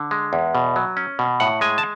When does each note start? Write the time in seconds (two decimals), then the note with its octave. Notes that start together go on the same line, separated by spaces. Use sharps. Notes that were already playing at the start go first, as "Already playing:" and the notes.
Already playing: D3
0.11 G#3
0.33 E2
0.55 B2
0.76 F#3
0.97 C#4
1.19 B2
1.40 A2 F#5
1.61 G#3 G#5
1.78 A5